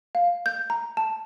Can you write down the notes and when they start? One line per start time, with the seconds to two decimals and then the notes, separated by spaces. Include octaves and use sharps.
0.15 F5
0.46 G6
0.70 A#5
0.97 A5